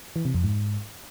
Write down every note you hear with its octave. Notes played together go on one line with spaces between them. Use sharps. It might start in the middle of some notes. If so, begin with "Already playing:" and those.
E3
C3
F2
G#2